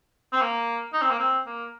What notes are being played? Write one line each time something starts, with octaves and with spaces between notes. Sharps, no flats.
C4
A#3
D#4
C4
A#3
C4
A#3